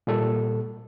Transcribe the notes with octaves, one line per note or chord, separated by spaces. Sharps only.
A#2 G3 A4